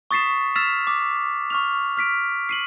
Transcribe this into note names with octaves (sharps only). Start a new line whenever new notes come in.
C#6 D#6 A6 B6 C7 E7
E6 F6 A6 B6 E7 F7
D6
C#6 F6 F7
F6 B6 D7
C7 D#7 F#7